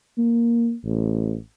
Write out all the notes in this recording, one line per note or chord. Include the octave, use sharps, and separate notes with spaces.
A#3
A1